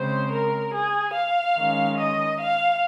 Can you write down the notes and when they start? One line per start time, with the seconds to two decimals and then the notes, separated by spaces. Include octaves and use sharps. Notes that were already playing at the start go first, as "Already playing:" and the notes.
Already playing: C#3 G#3 C4 C5
0.32 A#4
0.74 G#4
1.15 F5
1.57 D#3 G#3 C#4
1.98 D#5
2.40 F5